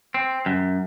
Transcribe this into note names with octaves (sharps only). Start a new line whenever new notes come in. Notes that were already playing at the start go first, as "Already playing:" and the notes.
C4
F#2